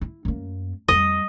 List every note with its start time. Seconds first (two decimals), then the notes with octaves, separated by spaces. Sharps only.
0.01 E4
0.25 F#2 A#3
0.88 F2 G3 D#5